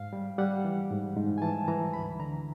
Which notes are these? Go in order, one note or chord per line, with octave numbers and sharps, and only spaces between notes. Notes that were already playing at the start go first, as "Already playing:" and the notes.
Already playing: G#2 F5
G3
G3 F#5
E3
G#2
G#2
G#5
E3 A5
E3 A#5
D2 B5
D3 A#5